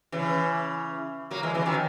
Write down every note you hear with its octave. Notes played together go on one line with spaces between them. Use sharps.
C#3 E3
F#3 A#3
E3 G#3
C#3 E3
D#3 F#3